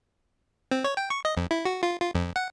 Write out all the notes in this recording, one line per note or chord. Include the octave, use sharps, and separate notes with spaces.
C4
C#5
G5
C#6
D#5
F2
E4
F#4
F4
F4
F2
F#5